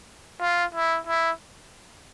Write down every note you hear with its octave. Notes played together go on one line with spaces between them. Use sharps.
F4
E4
E4